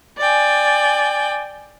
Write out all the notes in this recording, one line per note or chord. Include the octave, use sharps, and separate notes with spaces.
D5 G5 G#5